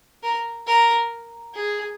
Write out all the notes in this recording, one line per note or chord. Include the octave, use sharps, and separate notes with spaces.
A#4
A#4
G#4